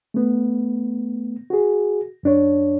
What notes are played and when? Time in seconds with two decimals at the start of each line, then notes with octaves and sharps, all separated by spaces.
0.14 A3 B3
1.50 F#4 G#4
2.23 F#2 D4 C#5